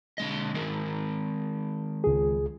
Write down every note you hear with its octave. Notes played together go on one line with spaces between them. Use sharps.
D3 G#3 D#5
D#3 G#3 A#4
C#2 G#4